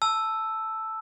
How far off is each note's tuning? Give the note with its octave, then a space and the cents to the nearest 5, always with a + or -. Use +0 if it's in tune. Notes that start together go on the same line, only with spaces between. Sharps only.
A5 +0 E6 +0